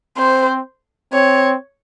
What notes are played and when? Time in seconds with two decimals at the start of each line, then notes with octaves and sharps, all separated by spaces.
0.17 C4 C5
1.13 C4 C#5